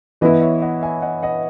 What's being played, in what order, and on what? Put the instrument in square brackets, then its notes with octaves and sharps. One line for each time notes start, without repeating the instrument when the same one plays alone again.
[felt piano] E3 B3 E4 [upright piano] B4 D#5
[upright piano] C#5 E5
D#5 F#5
E5 G#5
D#5 F#5
D#5 F#5